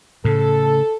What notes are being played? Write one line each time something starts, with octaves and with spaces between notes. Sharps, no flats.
A2 C#3 A4